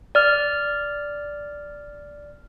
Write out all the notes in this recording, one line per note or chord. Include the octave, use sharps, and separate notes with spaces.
D5 F6